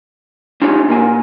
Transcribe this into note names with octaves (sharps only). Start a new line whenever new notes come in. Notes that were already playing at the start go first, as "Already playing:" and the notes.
D4 D#4 F4 G4 C#5 G#5
A#2 A#3 G#5